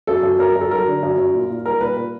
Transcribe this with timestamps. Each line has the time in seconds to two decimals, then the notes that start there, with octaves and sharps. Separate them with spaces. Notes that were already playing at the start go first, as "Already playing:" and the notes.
0.07 F#2 A4
0.23 F#2
0.39 F#2 A#4
0.56 F#2 A4
0.71 F#3 A#4
0.87 D3
1.03 F#2
1.18 F#2
1.34 A#2
1.50 A#2
1.65 G3 A#4
1.81 A#2 B4
1.96 A#2